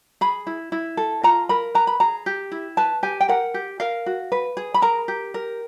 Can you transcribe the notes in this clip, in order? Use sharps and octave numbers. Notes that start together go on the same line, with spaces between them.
G#4 B5
E4
E4
A4
F4 A#5
A#4 B5
B4 A#5
B5
G#4 A#5
G4
E4
B4 A5
G4 G#5
G5
A#4 F#5
G4
A#4 F5
F#4
B4
G#4
B5
A#4 A#5
G4
A#4